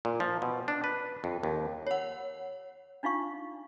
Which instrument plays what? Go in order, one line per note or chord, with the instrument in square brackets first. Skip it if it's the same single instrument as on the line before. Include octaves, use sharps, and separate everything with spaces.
[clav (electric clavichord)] A#2
F3
B2
D4
B4
F2
D#2
[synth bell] C#5 F#5
[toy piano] D4 D#4 F4 F5 C#6